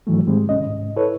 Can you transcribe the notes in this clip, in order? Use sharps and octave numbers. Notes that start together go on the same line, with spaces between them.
G#2 D#3 E3 F#3 G3 A3
G#2 D#3 G3 G#3 C4
C2 C#4 D#5
G#2
E4 A4 B4 C#5